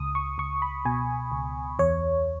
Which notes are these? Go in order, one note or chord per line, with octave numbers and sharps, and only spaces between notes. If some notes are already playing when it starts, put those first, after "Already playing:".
Already playing: C#2 D#6
C#6
C#2 C#6
B5
B2 G#5
C#2
E2 C#5